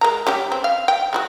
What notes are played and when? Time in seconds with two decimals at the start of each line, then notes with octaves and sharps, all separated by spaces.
0.01 G#3 A#4 A#5
0.27 G3 C#4 G4
0.52 C4
0.64 F5
0.88 G5
1.13 G#3 E4 F#4